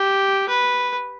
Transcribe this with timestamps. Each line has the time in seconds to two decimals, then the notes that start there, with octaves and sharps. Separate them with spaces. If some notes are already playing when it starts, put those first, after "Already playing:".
Already playing: G4
0.49 B4